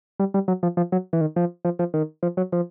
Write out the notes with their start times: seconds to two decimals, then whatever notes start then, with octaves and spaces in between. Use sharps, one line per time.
0.20 G3
0.34 G3
0.48 F#3
0.63 F3
0.77 F3
0.92 F#3
1.13 E3
1.21 D#3
1.36 F3
1.65 F3
1.79 F3
1.94 D#3
2.23 F3
2.37 F#3
2.52 F3